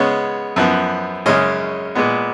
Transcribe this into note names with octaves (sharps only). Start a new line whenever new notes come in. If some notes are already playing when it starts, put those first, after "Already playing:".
Already playing: C#3 G#3 B3 C#5
F#2 F3 B3
F#2 C#3 G#3 C#4 D#5
A#2 G#3 B3